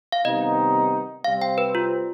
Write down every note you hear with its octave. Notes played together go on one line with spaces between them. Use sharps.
F5
C3 D#3 G3 B3 D#4 D#5
C3 G3 C4 F5
G5
B4
F4